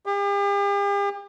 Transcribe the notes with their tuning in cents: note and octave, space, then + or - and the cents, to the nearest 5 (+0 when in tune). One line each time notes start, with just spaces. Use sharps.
G4 +45